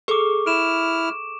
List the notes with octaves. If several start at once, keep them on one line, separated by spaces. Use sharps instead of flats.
G#4 A4 C#6 D6
E4 F6 D7 E7